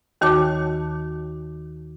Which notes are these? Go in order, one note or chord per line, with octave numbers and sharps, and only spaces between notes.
D#2 D#3 F#4 C#5 A5 D6